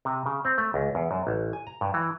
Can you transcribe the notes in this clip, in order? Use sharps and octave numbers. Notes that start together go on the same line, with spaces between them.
C3
C#3
C4
A3
C#2
E2
F#2
A1
G#5
A#5
G2
E3